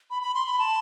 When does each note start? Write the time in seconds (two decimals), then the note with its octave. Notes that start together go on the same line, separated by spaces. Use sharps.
0.10 B5
0.23 B5
0.34 C6
0.47 B5
0.59 A5